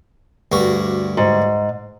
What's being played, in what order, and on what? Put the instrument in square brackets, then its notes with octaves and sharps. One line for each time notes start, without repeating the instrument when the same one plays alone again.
[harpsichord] D2 G2 F#4
[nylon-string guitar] G#2